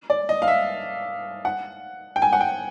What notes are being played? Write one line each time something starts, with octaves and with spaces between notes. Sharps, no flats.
D5
D#5
F5
E5
F#5
G5
G#5
F#5
G5